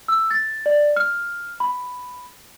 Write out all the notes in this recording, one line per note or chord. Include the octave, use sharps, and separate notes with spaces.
E6
A6
D5
F6
B5